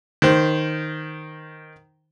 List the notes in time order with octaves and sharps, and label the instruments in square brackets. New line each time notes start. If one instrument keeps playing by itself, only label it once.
[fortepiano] D#3 C5